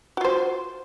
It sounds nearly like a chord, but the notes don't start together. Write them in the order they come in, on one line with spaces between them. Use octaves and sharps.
F#4 F4 C5